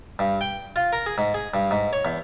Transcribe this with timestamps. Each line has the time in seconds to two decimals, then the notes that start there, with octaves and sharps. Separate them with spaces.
0.19 G2
0.41 G5
0.76 F4
0.93 A#4
1.06 G#4
1.18 G#2
1.34 G#4
1.54 G2
1.71 G#2
1.93 C#5
2.05 E2